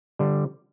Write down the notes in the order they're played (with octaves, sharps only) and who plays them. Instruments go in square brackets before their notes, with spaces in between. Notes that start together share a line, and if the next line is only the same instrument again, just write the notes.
[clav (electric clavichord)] D3 G3